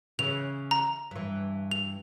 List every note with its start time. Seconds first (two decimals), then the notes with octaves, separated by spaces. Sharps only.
0.19 C#3 E3 F7
0.71 A#5
1.11 G2 E3
1.71 F7